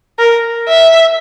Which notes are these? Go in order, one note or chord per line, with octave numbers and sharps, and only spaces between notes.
A#4
E5